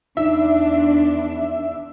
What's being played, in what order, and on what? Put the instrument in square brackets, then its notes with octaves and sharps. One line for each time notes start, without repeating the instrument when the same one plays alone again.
[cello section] E2 D4 [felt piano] D#4 [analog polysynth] E5